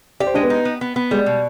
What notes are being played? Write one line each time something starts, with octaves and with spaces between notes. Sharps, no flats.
G4 D5
C5
G#3 D4 D5
B3 B4
D#4
B3
B3
B3
G3 G#3 G#4
B2